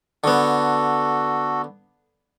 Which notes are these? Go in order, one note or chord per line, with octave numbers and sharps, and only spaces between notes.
D3 B3 F#4 A4